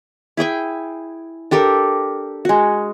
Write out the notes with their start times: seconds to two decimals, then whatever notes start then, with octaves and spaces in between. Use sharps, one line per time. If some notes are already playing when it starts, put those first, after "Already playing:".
0.37 E4 G#4 G5 G#5
1.51 D4 G4 A4 A#4
2.45 G#3 F#4